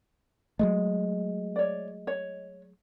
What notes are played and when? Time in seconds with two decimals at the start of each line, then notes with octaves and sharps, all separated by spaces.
0.59 F#3 G#3 A3 D#5
1.56 C#5 D5
2.07 C#5